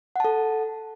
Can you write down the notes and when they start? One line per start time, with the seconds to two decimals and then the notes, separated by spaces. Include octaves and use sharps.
0.16 F#5
0.20 A5
0.25 A4